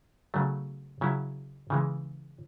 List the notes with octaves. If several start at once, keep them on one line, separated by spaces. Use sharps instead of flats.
C#3 F#3 A3
C#3 F#3 C#4 E4
C#3 E3 G#3